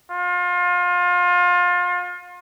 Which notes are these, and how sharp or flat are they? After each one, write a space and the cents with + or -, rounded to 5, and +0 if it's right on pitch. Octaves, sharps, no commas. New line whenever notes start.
F4 +30